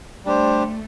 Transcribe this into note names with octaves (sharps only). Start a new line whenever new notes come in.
G3 A3 D4 G4 C5